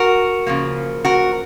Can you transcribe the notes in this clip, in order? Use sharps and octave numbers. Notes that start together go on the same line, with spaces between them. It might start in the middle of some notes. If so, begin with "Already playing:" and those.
Already playing: F#4 A#4
C#3 F3 A#3
F#4 A#4